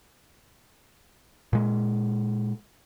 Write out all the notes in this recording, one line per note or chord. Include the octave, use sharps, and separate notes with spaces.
A#2 G#3